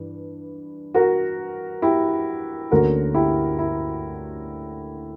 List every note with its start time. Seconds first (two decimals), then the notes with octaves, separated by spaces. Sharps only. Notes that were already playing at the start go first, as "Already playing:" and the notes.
Already playing: G2 E3
0.94 F#4 A#4
1.82 E4 G4
2.71 D2 D3 A#3 C#4 F#4 A#4
3.14 E4 G4
3.59 E4